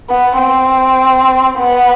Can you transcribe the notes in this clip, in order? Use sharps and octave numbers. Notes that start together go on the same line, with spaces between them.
B3
C4
B3